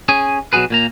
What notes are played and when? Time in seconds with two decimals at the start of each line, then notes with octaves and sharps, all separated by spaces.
0.09 C#4 G#4 G#5
0.53 B2 F#3 D#4 F#4 G#4 B4
0.70 A#2 A#3 A#5